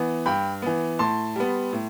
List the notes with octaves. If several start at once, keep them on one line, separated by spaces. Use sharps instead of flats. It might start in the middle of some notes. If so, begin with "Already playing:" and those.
Already playing: E3 B3
G2 G5 B5
E3 B3
A2 A5 C6
G3 B3
A2